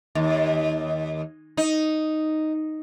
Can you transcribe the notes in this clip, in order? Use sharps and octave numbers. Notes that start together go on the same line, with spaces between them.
D#2
D#4